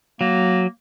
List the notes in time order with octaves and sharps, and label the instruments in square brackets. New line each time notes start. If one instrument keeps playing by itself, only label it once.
[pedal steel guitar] F#3 [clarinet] A#3